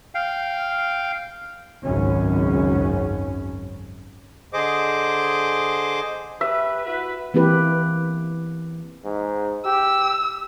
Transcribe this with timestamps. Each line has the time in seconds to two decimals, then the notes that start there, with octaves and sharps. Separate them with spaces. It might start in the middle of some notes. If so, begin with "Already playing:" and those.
0.15 F5 G5
1.84 G#1 C#2 F#2 C#4
4.53 D3 G#4 C5 D#5 D6
6.41 G4 B4 E5
6.86 E4 F#4 B4
7.34 E3 A#3 C4 E4 G4 B4
9.04 G#2
9.65 G4 E6